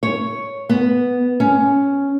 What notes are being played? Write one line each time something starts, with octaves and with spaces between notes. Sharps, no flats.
C#5
B3
C#4